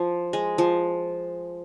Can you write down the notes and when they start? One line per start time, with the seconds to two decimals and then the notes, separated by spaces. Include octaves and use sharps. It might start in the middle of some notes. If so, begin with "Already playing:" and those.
Already playing: F3
0.33 G#3
0.58 F3